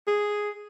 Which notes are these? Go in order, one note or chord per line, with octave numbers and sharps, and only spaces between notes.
G#4